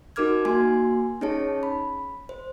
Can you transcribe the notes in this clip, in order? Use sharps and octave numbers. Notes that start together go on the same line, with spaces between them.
D#4 F#4 A#4 D6 F6 G#6
A#3 F#4 G#5 C6
C#4 D#4 G#4 C#5 A5
B5
C5